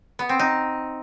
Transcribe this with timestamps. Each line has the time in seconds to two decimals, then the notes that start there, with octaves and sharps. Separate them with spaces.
0.19 B3
0.29 C4
0.39 D#4